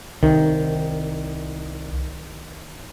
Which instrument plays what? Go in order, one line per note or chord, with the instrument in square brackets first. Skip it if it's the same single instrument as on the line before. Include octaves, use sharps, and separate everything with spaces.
[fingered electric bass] C2 [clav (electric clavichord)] D#3